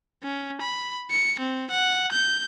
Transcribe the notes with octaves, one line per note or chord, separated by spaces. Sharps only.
C#4
B5
C#7
C4
F#5
G6